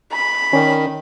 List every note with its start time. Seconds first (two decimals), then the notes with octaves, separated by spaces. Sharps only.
0.12 B5
0.53 D#3 C#4 D5